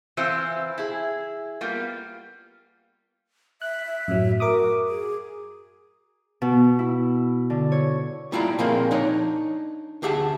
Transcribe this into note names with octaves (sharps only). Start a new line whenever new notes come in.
E3 C4 E4 F4 C5
E4 G#4
G3 A#3 B3 F4
E5 F#6
F#2 A2 F#3
F#4 A#4 D6 D#6
G#4
B2
E4
D3
C#5
G3 A3 E4 F4 D5 A#5
A#2 F3 G#3 A#3 C4
D4 D#4 C#5
D2 G4 G#4 E5 F#5 A5